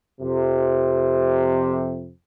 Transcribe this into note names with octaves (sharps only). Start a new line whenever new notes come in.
F2 C3